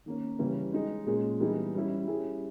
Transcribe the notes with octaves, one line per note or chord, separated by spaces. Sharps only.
D#3 A#3 C#4
C#3 E3 G3 C#4
G#3 D#4 G#4
A#2 G#3 C#4 G#4
E3 G3 B3 D#4 G#4
G3 C#4 E4
G3 C#4 E4 G#4